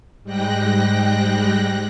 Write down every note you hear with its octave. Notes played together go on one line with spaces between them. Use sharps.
G#2 G3 G#3 G5 F#6 A#6